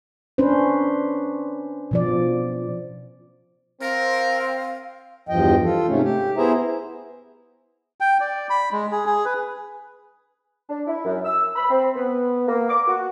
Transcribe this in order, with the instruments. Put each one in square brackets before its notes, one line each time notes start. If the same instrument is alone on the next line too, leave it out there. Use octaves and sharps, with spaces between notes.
[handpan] C#4 D4 B4 C5
B2 F3 D5
[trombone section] C4 [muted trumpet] A#4 [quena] F5
[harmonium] E2 G2 F3 D#5 G5
F4 A4
G#2 C3 A3 C#4
G4
B3 E4 G#4 C5 E5 A#5
[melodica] G5
D5
B5
G#3
G#4
G#4
B4
[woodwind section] D4
E4
F#2
E6
B5
C4
B3
A#3
D6
F#4